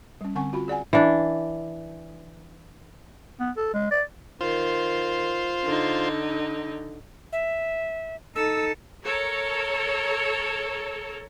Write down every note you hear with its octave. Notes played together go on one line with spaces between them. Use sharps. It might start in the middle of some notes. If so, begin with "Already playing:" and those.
G3 C#4
D3 C4 F#5 G#5 C#6
F4 F#4 B5
G#4 D5 F#5 G#5
E3 D4
B3
A4
G#3
D5
D#3 F4 C5
D3 D#4
E5
D#4 A4 E6
A4 A#4 C#5